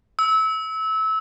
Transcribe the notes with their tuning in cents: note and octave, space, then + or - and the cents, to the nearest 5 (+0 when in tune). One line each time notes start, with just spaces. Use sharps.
E6 -25